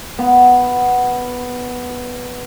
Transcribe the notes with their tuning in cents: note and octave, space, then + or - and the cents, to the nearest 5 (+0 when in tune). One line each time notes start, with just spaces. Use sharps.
B3 +0